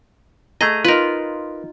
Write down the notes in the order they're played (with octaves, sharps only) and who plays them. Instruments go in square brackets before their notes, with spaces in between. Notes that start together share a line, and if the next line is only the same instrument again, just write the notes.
[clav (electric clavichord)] A3 G#4 D#5 [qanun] A#5
[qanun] D#4 F4 [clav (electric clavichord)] A#4 B4